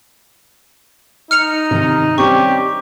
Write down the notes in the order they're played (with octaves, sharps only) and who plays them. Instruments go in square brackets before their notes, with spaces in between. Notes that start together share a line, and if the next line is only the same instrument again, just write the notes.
[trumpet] D#4 [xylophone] F6 C#7 F7
[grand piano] C3 D#3
[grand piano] G3 C4 C#4 [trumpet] G4 [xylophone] C#6